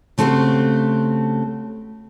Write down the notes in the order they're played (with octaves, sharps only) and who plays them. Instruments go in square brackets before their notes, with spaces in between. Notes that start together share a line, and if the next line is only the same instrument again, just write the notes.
[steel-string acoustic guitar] C#3 A3 C4 F#4 G4